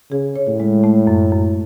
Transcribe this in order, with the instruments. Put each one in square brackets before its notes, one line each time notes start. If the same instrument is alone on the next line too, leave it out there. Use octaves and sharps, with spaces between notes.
[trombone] C#3 [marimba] G#4
[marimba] C#5
[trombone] A2
[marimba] G#3
A3
F#2
F#2